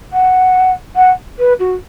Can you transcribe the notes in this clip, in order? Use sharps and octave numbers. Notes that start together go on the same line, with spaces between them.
F#5
F#5
B4
F#4